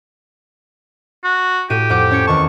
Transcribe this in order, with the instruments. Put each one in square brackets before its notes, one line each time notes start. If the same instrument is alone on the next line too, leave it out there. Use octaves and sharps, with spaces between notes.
[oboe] F#4
[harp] A2 F#4 D#7 [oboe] G4
[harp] F2 F#5 D6
C#4 G#6 C#7
[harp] E2 D#3 A5 [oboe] C#6